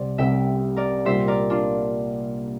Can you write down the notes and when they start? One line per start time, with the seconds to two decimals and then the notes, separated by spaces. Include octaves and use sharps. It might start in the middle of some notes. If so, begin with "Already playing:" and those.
Already playing: C2 C3 G3 C4 C5 D5
0.18 C2 C3 G3 C4 E5 G5
0.76 A#4 D5
1.05 C2 A#2 G3 A#3 C5 E5
1.28 A#4 D5
1.50 D4 F4